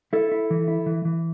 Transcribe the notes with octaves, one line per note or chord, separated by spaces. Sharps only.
E4 A4
E4
E3
E4
E3
E3